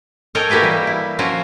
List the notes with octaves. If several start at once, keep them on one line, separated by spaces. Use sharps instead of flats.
A4 A#4 C#5 D#5 G5 G#5
A#3 F#4 G4 B4 F5
E3 G3
E4
F3 C#4 F4 F#4 A#4